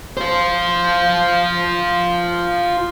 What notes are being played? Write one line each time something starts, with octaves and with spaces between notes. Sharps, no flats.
F4 C5